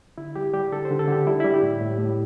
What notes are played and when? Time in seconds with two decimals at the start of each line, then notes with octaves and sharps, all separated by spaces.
0.18 D3 E4
0.36 G3 G4
0.53 G3 G4
0.72 D3 A4
0.85 C5
0.91 D3
0.99 A4
1.08 D3 G4
1.26 G3 E4
1.40 G3 E4
1.54 G4
1.63 A2
1.81 A2
1.98 A2